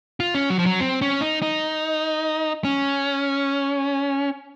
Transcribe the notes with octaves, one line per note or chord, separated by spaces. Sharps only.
F4
C#4
F#3
F3
F#3
C4
C#4
D#4
D#4
C#4